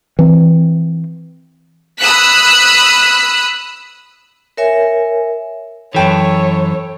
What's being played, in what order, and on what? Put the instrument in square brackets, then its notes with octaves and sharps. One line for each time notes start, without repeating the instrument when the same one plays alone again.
[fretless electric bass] E3 C4
[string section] B5 D#6 E6 F#6 B6
[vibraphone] A#4 C#5 E5 G#5
[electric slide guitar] F#2 E3 [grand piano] A4 G5 A5 [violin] C#5